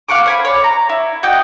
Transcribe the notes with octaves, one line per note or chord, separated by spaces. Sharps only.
F5 F#5 C#6 D6
C5 G#5 B5
C#5 D5
A#5
E4
F#4 D5 D#5 G5